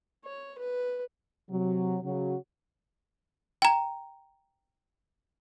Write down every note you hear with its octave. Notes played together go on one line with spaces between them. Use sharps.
C#5
B4
C3 F#3
C#3 F#3
G5 A#5